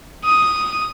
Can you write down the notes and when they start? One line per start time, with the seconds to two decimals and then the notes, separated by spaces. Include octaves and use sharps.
0.25 D#6